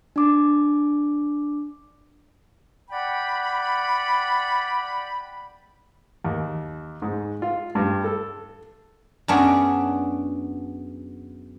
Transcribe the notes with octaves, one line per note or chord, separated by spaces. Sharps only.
D4 D6
D5 F#5 G5 B5
D#2
G#2
F4
G2
A4
F#2 B3 D4 G#4 C#5